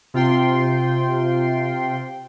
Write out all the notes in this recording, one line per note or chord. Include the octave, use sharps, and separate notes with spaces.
C3 F4 G5 C6